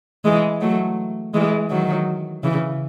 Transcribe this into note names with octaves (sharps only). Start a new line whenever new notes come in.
E3 G#3
F#3 A3
E3 G#3
D#3 F#3
C#3 E3